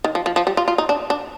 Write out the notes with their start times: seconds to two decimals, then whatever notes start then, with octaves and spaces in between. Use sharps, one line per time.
0.04 D#3
0.15 F3
0.26 F3
0.36 F3
0.47 G3
0.57 F4
0.68 F4
0.78 D#4
0.89 D4
1.10 D4